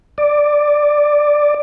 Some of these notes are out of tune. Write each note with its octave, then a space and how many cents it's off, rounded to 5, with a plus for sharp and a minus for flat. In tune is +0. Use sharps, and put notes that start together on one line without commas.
D5 +5